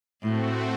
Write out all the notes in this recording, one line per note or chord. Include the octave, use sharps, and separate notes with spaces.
A2 A3 C4 F#4